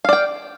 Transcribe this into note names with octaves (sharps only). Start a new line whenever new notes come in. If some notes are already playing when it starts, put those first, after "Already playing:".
D5 F5 G5